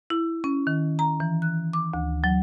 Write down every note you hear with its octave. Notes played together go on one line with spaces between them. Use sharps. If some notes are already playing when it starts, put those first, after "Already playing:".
E4
C#4
D#3
A#5
E3
F#6
D6
D2
F#3